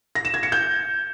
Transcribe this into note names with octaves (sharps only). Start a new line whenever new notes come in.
A#6
E7
G#6
C#7
G6